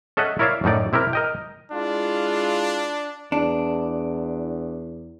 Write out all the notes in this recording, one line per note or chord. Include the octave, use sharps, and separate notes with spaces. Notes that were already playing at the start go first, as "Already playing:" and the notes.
C#4 A4 D#5 E5 F#5
E4 A#4 C#5 D5 E5 F5
F#2 A2 D#4 D5
C3 E4 G4 A#4
A#4 D#5 G5
G#3 D4 E4 F4
E2 D4